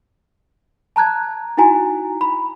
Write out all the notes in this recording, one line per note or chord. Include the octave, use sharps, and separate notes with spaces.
A5 A#5 F#6 G#6
D#4 E4 F#4 G#5 A#5
B5